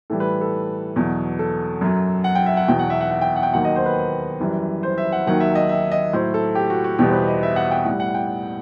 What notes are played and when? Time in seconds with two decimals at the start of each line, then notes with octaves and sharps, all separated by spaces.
0.10 A2 E3 G3 A4
0.20 B4
0.41 A4
0.96 E2 B2 F#3
1.39 A4
1.81 F#2 F#3
2.24 F#5
2.35 G5
2.46 E5
2.57 F#5
2.68 E2 B2 F#3 G5
2.79 F#5
2.90 E5
3.01 F#5
3.11 F#5
3.21 G5
3.36 F#5
3.43 G5
3.54 D#2 D#3 F#3 F#5
3.65 D#5
3.76 C5
3.86 B4
4.40 F#2 E3 G3
4.83 C5
4.98 E5
5.12 F#5
5.27 D#2 D#3 F#3 F#5
5.40 E5
5.55 D#5
5.69 E5
5.92 D#5
6.13 A2 F#3 C5
6.34 A4
6.55 G4
6.70 F#4
6.84 F#4
6.99 E2 B2 G3 G4
7.08 C5
7.13 B4
7.27 D#5
7.43 E5
7.56 F#5
7.71 G5
7.85 A2 G3 F#5
8.00 F#5
8.14 G5